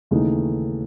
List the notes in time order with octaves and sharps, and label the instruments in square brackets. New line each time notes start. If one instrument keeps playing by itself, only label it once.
[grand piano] D#2 C#3 E3 A3 D#4